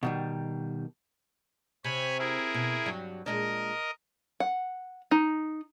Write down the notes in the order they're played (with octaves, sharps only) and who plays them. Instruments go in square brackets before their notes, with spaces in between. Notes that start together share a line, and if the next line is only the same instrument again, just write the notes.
[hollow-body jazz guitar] B2 D#3 G3
[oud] C3 [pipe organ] C#5 G#5 B5
[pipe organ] E4 G#4 A#4
[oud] B2
G2 F#3 G3
[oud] A#2 G#3 D4 [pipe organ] A#4 D#5
[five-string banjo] F#5
D#4